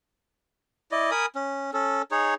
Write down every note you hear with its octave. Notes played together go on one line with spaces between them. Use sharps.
E4 D5 D#5
A#4 G#5 B5 D#6
C#4
C#4 A4
D#4 G#4 C#5